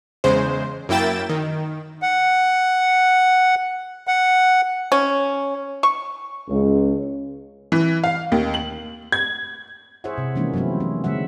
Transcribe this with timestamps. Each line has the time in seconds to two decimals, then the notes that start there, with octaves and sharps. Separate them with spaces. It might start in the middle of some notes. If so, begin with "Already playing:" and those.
0.24 E2 C#3 G#3 C5
0.89 F#2 A#3 E4 G5 A6 E7
1.29 D#3
2.02 F#5
4.07 F#5
4.92 C#4
5.83 C#6
6.49 C#2
7.72 E3
8.04 F5
8.32 D#2
8.54 F#7
9.12 G#6
10.04 E4 G#4 C5 C#5 E5 F#5
10.18 C3
10.36 E3 F3 G#3 A#3 C#4 D#4
10.54 F#3 A3 B3 C4 E4
10.80 C#4
11.04 D3 G3 G#3 B3 E5 F#5